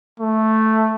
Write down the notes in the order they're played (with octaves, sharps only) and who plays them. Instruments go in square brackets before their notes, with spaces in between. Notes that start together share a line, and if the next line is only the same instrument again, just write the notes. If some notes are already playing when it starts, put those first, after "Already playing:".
[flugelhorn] A3